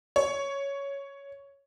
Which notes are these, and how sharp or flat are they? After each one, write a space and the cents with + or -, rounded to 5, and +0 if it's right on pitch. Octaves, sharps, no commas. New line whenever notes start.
C#5 +0